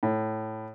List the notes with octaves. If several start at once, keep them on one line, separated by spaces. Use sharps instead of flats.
A2